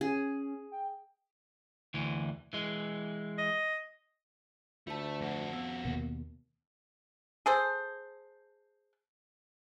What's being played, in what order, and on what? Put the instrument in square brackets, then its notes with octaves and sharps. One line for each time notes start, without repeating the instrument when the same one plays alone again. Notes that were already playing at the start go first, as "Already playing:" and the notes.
[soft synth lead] C#4 [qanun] G#4
[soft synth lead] G5
[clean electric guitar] D2 E3
E3 G#3
[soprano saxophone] D#5
[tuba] D2 [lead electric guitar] A3 [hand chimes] F4 A5
[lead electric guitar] F2 F#4
[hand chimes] B3
[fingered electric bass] D#2 B2 [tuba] A#3
[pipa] G#4 A4 C5